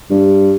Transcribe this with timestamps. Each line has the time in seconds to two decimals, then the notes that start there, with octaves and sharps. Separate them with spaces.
0.10 G2